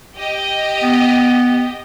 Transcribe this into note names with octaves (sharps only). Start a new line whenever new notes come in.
G4 D#5
B3